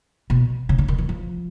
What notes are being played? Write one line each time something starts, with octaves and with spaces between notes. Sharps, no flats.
B2
C#3
D3
D#3
E3
F3